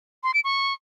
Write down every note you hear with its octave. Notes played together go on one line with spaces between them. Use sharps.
C6
D7
C#6